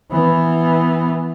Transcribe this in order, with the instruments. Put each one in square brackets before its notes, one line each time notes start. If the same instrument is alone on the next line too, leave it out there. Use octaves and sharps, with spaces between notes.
[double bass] E3 B3